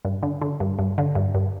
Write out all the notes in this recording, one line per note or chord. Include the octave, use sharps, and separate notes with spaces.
G2
D3
D3
G2
G2
D3
G2
G2